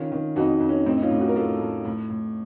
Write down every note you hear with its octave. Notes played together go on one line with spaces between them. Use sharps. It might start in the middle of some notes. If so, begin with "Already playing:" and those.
Already playing: D#3 C#4 F4
D#3
F2 D#4 F#4
F2
C#4
A2 C4 D#4
D#4
C#4 F4
A2
D#4 F#4
A#4
A2 F4 A4
A2
A2
A2